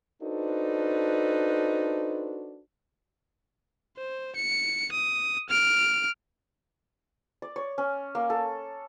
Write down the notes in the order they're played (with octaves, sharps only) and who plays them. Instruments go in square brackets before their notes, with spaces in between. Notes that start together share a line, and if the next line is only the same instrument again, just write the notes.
[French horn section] D4 D#4 F#4 A4 B4 C5
[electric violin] C5
C#7
D#6
F6 D7
[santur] D5
C#5
C#4
A#3
A4